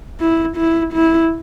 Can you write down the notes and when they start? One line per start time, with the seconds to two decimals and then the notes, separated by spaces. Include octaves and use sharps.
0.20 E4
0.57 E4
0.94 E4